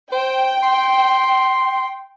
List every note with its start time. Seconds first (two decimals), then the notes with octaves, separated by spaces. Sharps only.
0.12 C5 G5
0.63 C6